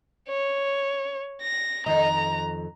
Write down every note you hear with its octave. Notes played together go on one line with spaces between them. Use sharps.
C#5
A#6
F2 D#3 D#5 A#5